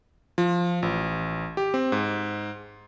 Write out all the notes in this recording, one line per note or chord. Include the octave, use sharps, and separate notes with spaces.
F3
A1
G4
C4
G#2